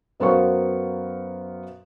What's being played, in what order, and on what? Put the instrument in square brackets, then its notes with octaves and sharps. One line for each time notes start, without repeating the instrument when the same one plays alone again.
[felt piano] F#2 B3 A#4 C5 F5 C#6